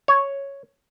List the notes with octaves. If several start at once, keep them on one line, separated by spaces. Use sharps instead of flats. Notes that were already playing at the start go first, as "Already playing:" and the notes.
C#5